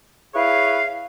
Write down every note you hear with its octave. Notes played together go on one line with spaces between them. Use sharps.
E4 G#4 B4 C#5 F5